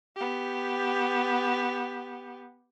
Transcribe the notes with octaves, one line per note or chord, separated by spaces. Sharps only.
B3 G4